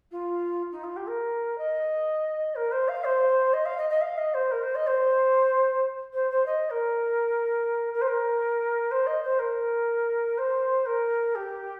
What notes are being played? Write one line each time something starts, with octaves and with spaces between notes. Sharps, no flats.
F4
D#4
F4
G4
A#4
D#5
A#4
C5
F5
C5
D#5
F5
D#5
D#5
F5
D#5
C5
A#4
C5
D#5
C5
C5
C5
D#5
A#4
A#4
C5
A#4
C5
D#5
C5
A#4
C5
A#4
G4